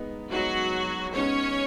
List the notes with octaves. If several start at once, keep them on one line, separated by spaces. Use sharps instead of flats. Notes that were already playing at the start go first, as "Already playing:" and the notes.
Already playing: G#3 B3 D#4 B4
F#3 G#3 B3 D#4 F#4 B4
G#3 B3 C#4 D#4 B4 C#5